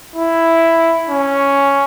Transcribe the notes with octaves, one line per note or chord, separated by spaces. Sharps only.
E4
C#4